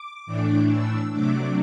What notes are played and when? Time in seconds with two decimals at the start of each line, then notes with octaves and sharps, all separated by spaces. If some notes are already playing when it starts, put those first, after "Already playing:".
Already playing: D6
0.26 A2 E3 A3 D4
0.69 E6
1.12 C3 F#3 A3 D4 D6